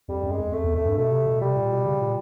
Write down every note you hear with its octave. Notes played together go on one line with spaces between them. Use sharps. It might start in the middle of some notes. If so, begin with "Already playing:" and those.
F2 G3
F#2
G#3
F2
F2 A3
E2
F2 A3
G2
B2 A3
C3
B2
C3 G3
A#2
B2
C#3
A#2